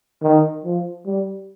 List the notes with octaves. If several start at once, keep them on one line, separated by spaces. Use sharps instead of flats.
D#3
F3
G3